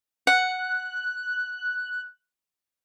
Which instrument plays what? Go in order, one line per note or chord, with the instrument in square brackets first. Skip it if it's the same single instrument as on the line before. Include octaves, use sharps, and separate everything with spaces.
[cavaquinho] F#5 [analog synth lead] F#6